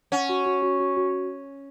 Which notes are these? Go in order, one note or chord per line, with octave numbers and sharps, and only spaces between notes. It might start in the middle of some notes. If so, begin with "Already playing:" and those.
C#4 F#5
F#4
F#4
F#4
F#4
F#4